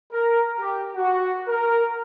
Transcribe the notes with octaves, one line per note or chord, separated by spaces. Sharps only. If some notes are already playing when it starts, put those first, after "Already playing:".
A#4
G4
F#4
A#4